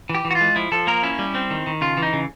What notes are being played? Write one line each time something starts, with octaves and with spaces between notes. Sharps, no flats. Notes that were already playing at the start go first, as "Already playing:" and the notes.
E3
G4
E3
F#4
F4
G#3
F3 E4
F3 A4
A#3 A#4
C#4 E4
G3
C4
D#3
D#3
C#3 F4
E3
D#4
C#3